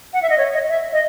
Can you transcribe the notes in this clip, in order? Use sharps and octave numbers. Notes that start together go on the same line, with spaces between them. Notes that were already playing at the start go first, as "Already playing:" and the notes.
F#5
E5
D#5
C#5
D#5
E5
D#5